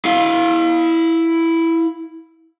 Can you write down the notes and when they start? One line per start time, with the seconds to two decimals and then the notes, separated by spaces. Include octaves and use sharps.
0.05 E4 F5